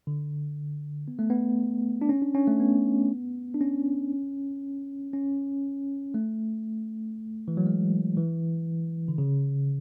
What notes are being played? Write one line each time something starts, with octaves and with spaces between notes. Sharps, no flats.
D3
B3
A3
B3
D4
C#4
D4
C#4
A3
B3
D4
C#4
C#4
A3
E3
F#3
G#3
E3
D3
C#3